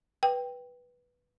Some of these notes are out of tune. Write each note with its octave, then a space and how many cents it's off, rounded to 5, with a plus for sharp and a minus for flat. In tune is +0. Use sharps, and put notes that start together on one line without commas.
B4 -10 G5 +0